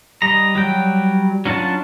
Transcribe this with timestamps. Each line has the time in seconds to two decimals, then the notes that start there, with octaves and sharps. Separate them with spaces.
0.22 G3 D#5 A#5
0.55 F#3 G3 G5
1.46 F#3 C#4 D4 F4 A5